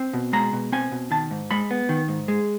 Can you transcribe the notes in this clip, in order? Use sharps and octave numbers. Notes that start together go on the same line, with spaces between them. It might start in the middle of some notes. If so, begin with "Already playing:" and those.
Already playing: C4
B2
G#3 A#5
B2
C4 G#5
B2
D#3 A5
G#2
G#3 B5
B3
D#3
G#2
G#3